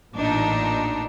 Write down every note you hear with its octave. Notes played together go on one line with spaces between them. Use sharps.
A1 A#2 D4 D#4